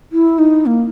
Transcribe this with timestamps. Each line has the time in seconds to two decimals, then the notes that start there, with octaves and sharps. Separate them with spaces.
0.12 E4
0.38 D#4
0.66 A#3